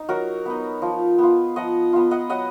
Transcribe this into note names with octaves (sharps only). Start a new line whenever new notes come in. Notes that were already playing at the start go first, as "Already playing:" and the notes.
Already playing: D#4
F#3 F#4 A#4
B3 D#4
F3
B3 F4
F3 D#5 F#5
B3 F4
D#5 F#5
F#3 D#5 F#5